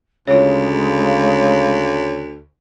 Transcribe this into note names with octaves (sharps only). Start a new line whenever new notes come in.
D2 C#3 G#3 F4 C#5